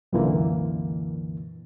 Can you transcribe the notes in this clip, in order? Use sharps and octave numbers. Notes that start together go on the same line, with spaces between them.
C2 F#2 A#2 D3 E3 A#3